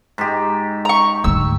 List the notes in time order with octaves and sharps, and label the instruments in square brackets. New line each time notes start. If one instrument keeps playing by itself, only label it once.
[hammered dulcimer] G#2 G4
[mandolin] A#5 C#6
[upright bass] D2 G#2 [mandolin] E6